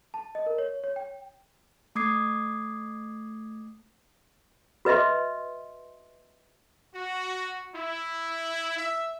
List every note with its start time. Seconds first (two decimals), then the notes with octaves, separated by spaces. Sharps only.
0.14 A5
0.35 D#5
0.46 A#4
0.58 C#5
0.84 C#5
0.96 G5
1.95 A3 D6 D#6 G#6 C7
4.85 F#4 B4 D#5 E5 C6
6.94 F#4
7.75 E4
8.78 E5